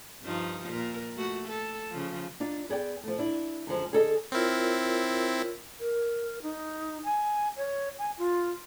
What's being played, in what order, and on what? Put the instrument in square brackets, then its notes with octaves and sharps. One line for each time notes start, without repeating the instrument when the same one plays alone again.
[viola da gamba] G2 F3 D#4
A#2 A#4
A3 F#4
A4
C#3 F3
[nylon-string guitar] D4 D#4 F4
B3 G#4 D5 G5
F3 A3
D4 E4
F#2 D3 F3 G#3
D3 G#4 A4 D#5
[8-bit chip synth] C4 E4 [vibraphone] F4 A#4 C#5
[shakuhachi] A#4
D#4
G#5
C#5
G#5
F4